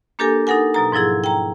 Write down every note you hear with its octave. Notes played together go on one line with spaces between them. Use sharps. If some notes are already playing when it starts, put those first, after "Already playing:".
A#3 D4 G4 A4 A#4 G#5
D#4 A4 A#4 F#5 G#5
B2 F#3 A#5
G#2 F3 F#3 E4 G#4
G5 A#5